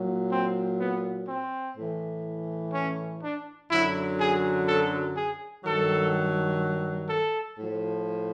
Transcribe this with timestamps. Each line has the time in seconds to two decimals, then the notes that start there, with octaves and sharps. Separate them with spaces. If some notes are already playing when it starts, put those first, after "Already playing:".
Already playing: A#2 F#3
0.31 C4
0.80 B3
1.28 C4
1.77 A2 E3
2.74 C#4
3.22 D4
3.71 F#2 D3 F#3 E4
4.19 G#4
4.67 A4
5.16 G#4
5.65 G2 D#3 F#3 A4
7.09 A4
7.58 A2 F3